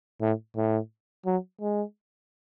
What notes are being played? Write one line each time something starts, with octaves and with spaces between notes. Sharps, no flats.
A2
A2
F#3
G#3